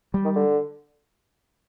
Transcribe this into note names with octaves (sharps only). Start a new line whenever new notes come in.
G3
D#3
D3